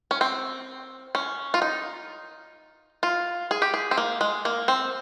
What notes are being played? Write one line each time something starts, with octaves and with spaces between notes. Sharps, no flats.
C#4
C4
C#4
F4
D#4
F4
G#4
G4
G#4
C4
A#3
G#3
A#3
C4